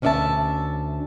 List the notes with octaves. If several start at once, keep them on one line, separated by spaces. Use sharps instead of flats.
D2 C#4 D4 D5 E5 A5